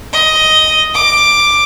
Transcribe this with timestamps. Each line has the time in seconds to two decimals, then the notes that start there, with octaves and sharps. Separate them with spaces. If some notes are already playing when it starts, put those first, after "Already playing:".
0.13 D#5
0.95 D6